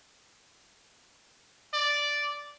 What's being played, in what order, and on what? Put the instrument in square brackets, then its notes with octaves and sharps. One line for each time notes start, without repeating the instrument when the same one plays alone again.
[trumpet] D5